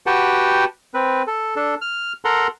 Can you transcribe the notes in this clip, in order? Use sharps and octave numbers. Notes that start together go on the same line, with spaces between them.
F#4 G4 B4 F#5 G5 A5
C4 B4
A4
D4 A4
F6
A4 A#4 F#5 A#5 C6